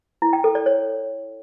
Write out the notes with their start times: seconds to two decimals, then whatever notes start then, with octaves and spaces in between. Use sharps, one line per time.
0.22 E4
0.33 G5
0.44 A4
0.55 D5
0.66 C#5